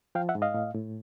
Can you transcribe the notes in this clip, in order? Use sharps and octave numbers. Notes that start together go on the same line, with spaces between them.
F3 F5 G5
E5 F#5
G#2
D#5 F5
A2
A2